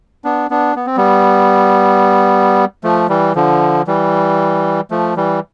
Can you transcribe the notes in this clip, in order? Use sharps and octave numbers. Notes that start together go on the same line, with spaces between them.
B3 D4
B3 D4
B3
C4
G3 B3
F3 A3
E3 G3
D3 F3
E3 G3
F3 A3
E3 G3